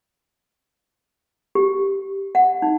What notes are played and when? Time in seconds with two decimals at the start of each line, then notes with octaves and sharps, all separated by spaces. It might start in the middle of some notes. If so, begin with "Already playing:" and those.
1.55 G4
2.35 F#5
2.62 D#4